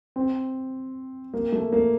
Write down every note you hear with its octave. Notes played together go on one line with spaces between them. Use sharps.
C4
A#3
A3
A#3